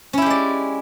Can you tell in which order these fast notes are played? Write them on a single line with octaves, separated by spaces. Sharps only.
C#4 E4 G4 G#3 D5